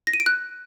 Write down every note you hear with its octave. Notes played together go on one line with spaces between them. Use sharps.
A#6
D#7
D7
F#6